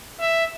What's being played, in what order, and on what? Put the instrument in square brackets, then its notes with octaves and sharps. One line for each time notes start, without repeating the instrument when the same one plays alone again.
[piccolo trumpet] E5